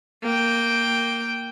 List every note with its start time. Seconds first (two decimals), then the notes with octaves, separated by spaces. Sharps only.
0.23 A#3 G5